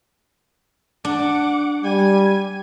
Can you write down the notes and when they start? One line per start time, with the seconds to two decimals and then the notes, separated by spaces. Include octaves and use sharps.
1.05 D4 F#5 D6
1.84 G3 G#5